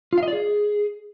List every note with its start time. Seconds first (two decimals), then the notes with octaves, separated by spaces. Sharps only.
0.13 F4
0.18 F5
0.23 D#5
0.28 D5
0.33 G#4